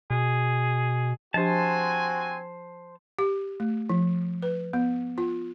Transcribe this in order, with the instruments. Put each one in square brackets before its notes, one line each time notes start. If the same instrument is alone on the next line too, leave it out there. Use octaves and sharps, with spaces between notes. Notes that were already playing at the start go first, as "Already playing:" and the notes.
[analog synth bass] B2 [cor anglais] G#4
[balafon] F3 D4 G4 [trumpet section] C4 F#4 G#5 [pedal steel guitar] C5 A5
[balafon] G4
A3
F3
B4
B3
F4